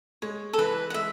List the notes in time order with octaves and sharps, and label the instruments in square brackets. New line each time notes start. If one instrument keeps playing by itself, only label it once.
[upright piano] G#3 [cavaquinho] C#5
[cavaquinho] A4
[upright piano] E3 [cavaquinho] B4
[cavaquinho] F#5
[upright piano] G#3 [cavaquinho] E5